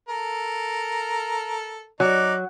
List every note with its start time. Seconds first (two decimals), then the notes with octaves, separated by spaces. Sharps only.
0.09 A4 A#4
2.00 F#3 D#4 D5